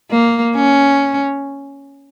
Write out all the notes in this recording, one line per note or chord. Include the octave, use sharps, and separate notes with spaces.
A#3
C#4